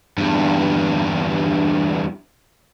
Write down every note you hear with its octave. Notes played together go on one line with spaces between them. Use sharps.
E2 G2